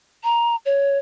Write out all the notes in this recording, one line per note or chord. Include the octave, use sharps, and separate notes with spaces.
A#5
C#5